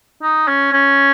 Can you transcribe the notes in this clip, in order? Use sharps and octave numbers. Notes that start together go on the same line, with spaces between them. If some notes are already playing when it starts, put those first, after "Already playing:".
D#4
C#4
C#4